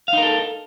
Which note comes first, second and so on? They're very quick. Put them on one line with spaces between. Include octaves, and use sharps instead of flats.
F5 D#4 A#4 A4